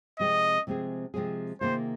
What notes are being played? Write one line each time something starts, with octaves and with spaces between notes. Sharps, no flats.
C3 F3 G#3 C4 G#4 D#5
C3 F3 G#3 C4 G#4
C3 F3 G#3 C4 G#4
C3 D#3 A#3 F4 G#4 C5